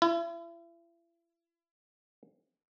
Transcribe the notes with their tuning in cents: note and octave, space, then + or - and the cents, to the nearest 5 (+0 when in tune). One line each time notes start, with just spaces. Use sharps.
E4 +40